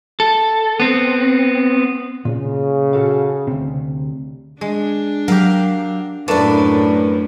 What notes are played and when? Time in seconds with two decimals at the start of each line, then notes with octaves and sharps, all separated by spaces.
0.20 A4
0.80 B3 C4
2.25 A#2 C#3
2.93 F#4 A4 F5
3.47 D2 C3
4.61 G#3 D4
5.28 F#3 G4 A#4 F5
6.28 F#2 A2 A3 A#3 D4 B4 D5